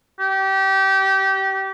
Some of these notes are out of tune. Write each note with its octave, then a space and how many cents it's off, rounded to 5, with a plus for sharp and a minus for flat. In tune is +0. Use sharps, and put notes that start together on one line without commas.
G4 -25